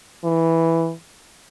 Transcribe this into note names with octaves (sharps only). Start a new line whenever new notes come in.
E3